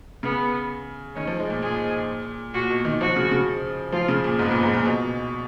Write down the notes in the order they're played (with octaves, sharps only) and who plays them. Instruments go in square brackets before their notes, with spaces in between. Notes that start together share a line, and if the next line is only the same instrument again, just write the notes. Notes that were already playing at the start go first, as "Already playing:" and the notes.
[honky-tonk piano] C#3 [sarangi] B3
[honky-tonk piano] D#3 [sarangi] C#4
[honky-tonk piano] F3
G#3
A#2
[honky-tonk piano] A#2 [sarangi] G#4
[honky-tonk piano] A#2 [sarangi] F#4
[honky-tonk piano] B2
D#3
[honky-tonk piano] F3 [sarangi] F#4
[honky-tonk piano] C#3
C#3
[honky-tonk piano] F3 [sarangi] F4
[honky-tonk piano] C#3
A#2
[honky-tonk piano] G#2 [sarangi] B3
[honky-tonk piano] A#2
G#2
A#2
B2